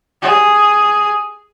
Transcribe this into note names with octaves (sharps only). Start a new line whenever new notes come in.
G#4